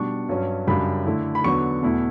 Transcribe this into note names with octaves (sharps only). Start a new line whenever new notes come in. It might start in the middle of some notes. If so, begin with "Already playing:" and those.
Already playing: B2 G3 D4 C#6
G2 F#3 C#4
F#2 C#3 G3 D4 B5
D3 A3 E4
B5
E2 D3 F#3 B3 C#6
E2 B2 A3 E4